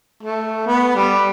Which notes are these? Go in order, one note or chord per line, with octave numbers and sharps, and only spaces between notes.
A3
B3
G3